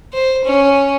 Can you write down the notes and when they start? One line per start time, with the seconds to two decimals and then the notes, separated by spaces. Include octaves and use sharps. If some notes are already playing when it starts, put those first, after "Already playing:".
0.13 C5
0.44 C#4